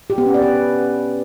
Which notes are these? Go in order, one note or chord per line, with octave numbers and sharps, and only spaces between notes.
G4
B3
C#4
D5
B4